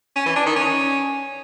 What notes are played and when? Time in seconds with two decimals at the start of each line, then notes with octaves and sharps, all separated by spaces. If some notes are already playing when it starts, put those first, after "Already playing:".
0.16 C#4
0.26 E3
0.36 D4
0.46 D#3
0.56 C#4